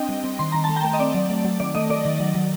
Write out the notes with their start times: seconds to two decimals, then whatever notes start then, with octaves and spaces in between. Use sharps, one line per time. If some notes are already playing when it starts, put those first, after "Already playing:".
Already playing: C4 D4 D#5 G5
0.09 G3
0.24 C4
0.39 D#3 C6
0.52 D#3 A#5
0.64 A5
0.69 A3
0.76 G5 A#5
0.84 A3
0.93 D#5
0.99 C4 D5
1.14 F#3
1.30 A3
1.45 F#3
1.60 D#3 D5
1.75 A3 D#5
1.90 A3 D5
2.05 D#3
2.20 F#3
2.35 F#3